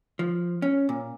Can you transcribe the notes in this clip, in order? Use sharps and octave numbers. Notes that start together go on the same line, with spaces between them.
F3
C#4
A#2